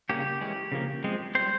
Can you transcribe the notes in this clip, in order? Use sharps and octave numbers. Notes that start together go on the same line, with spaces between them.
C#3 G3 A#3 C#4 G4
E3 G#3 C#4
C#3 F3 A#3
F3 G#3 C4
G3 C4 C5